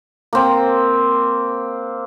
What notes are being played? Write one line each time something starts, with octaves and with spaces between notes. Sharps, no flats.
A#3 C4